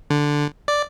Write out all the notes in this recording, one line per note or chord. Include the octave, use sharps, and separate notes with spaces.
D3
D5